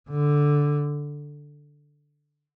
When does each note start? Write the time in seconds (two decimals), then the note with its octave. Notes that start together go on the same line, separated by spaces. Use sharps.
0.09 D3